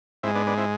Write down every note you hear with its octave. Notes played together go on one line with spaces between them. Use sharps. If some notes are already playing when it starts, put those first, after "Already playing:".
G#2 G#3 C4 E4
B3 D4
B3 D4
C4 E4